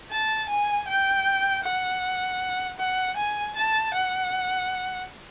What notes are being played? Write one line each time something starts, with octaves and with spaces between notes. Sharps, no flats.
A5
G#5
G5
F#5
F#5
G#5
A5
F#5